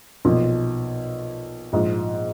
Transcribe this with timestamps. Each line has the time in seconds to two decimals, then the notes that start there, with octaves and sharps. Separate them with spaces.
0.25 B1 A#2 F3
1.73 A#1 G#2 F3